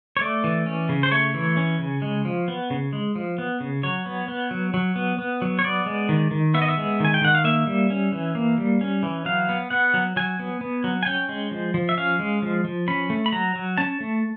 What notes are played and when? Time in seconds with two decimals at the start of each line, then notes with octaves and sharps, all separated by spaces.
0.17 C#5
0.21 A3 D5
0.44 E3
0.66 C#4
0.89 C#3
1.03 C5
1.11 A3 C#5
1.34 E3
1.57 C#4
1.79 C#3
2.02 G#3
2.25 F3
2.48 B3
2.70 C#3
2.93 G#3
3.16 F3
3.38 B3
3.60 C#3
3.83 F#3 C#5
4.06 B3
4.28 B3
4.51 F#3
4.74 F#3
4.96 B3
5.19 B3
5.42 F#3
5.59 C#5
5.64 B3 D5
5.86 G#3
6.09 D#3
6.31 D#3
6.54 B3 E5
6.62 D#5
6.68 E5
6.78 G#3
7.00 D#3 G#5
7.14 G5
7.22 D#3 F#5
7.35 F5
7.44 A#3 E5
7.67 G3
7.90 C#4
8.12 E3
8.35 A#3
8.58 G3
8.81 C#4
9.03 E3
9.25 F#3 F5
9.49 B3
9.70 B3 F#5
9.94 F#3
10.16 F#3 G#5
10.39 B3
10.61 B3
10.84 F#3
11.03 G#5
11.06 C#4 G5
11.29 G#3
11.51 F3
11.74 F3
11.89 E5
11.97 C#4 F5
12.19 G#3
12.42 F3
12.65 F3
12.88 C#4 B5
13.10 A3
13.26 B5
13.32 F#3 A#5
13.56 F#3
13.78 C#4 A5
14.00 A3